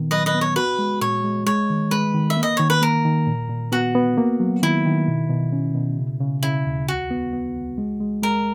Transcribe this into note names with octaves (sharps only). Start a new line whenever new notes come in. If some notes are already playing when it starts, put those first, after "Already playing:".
Already playing: A#2 D#3 B3
F#3 B4 D#5
B4 D#5
B3
C#5
F#4 B4
G#3
A#2 C#5
G#3
G#3 C#5
D#3
G#3 B4
D#3
E5
A#3
D#5
D#3 C#5
B4
A#3 A#4
D#3
A#2
A#2
B3 F#4
B3
A#3
F#3
D#3 E4
D#3
B2
B2
C#4
B2
C#3
C#3
C#3 E4
D#2
C#2 F#4
B3
B3
C#2
G#3
G#3
G#3 A#4